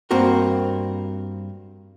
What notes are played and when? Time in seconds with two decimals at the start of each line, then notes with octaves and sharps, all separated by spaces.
0.11 G2 A#3 C4 F#4 A#4